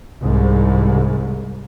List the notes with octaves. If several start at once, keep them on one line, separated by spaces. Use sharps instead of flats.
C2 G#2